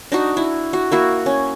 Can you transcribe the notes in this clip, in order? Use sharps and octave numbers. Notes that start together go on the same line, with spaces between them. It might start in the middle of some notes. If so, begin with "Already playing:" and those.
D4 D#4 F#4
E4
F#4
A#3 E4 F#4
C#4